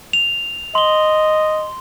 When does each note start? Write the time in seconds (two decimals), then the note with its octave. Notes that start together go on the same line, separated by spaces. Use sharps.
0.13 F7
0.75 D#5 C6 G7